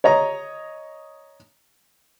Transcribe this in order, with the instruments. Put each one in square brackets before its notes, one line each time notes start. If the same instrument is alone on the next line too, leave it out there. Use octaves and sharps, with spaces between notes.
[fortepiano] C#5 D#5 A#5